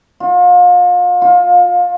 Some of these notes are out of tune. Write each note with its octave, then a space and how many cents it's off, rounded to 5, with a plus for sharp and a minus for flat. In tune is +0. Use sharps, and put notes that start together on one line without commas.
F4 +35
F4 +25